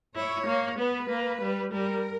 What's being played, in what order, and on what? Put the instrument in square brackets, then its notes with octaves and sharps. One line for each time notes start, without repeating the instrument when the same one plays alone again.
[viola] E4 [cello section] C#5
[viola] A#3
[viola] B3 [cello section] B4
[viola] A#3
G3
[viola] G3 [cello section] A#4